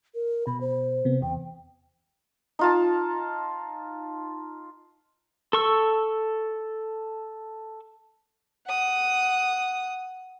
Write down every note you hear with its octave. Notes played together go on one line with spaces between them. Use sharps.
A#4
B2 B5
C5
C3 B3
E2 G5
D#4 F4 A5
A4 C#6 E6
F#5 D#6